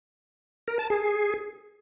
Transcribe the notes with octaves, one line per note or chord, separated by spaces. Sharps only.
A#4
A5
G#4